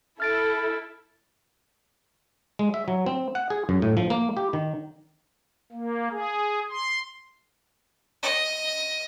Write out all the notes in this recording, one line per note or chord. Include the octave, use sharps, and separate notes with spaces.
E4 A4 F6 A6 D7
G#3
E5
F#3
C4
F#5
G#4
F#2
A2
F3
A#3
G4
D#3
A#3
G#4
C6
D#5